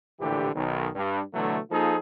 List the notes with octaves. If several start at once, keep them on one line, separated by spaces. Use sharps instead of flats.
A#1 A2 D3 E3 G4
B1 D#3
G2
B2 D3 E3 F#3 A3
F3 A#3 D#4 F4 G#4 A4